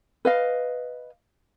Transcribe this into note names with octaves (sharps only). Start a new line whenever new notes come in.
B4 D#5 F5